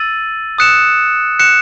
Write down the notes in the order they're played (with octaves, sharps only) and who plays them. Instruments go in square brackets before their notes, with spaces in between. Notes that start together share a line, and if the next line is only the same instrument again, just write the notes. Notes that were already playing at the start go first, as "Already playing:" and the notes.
Already playing: [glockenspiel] E6 A6 D#7 F#7
D#6 F#6 C#7 E7
F#6 C#7 E7